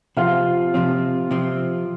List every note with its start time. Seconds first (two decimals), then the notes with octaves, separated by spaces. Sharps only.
0.17 C3 F3 C4 F4
0.74 C3 F3 C4
1.31 C3 F3 C4